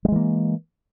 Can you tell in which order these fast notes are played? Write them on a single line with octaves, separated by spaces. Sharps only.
G3 G#3 E3 A#3